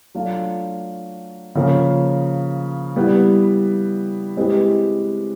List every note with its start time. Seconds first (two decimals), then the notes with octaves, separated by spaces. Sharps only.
0.15 F#3 A3 D4 F4
1.55 C#3 F3 A#3 C#4
2.96 G3 B3 E4
4.37 G#3 C4 E4 G4 B4